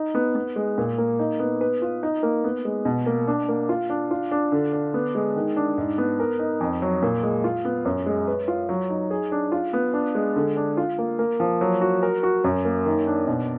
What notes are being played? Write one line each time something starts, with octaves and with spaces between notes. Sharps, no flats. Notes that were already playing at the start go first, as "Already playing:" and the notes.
Already playing: D#4
B3
B3
G#3
A#2
A#3
D#4
B3
B4
F4
D#4
A#3
B3
G#3
B2
A#3
D4
A#3
F4
D4
F4
D4
D3
D4
B3
G#3
D#3
D4
G#2
B3
A#4
D#4
F2
F#3
A#2
G#3
F4
B3
F#2
G#3
B4
F4
F#3
D#4
G#4
D4
F4
B3
D4
G#3
D3
D4
F4
A#3
A#3
F3
F#3
F#4
A#4
F#4
F#2
A#3
D#3
D4
B2